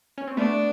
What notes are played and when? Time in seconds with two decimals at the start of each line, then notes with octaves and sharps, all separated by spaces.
0.18 C#4
0.27 C4
0.37 A3 B3 D4